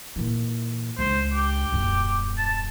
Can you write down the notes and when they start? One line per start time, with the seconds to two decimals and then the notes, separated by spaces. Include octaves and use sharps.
0.16 A#2 E3
0.99 C#2 D4 C5
1.33 G4
1.72 D#1 F#2
2.38 A5